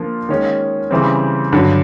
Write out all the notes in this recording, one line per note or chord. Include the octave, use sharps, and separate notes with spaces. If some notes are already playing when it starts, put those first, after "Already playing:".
Already playing: F3 A#3 D4 F4
D#3 G#3 C#4
C#3 E3 G3 C4
G2 D3 F#3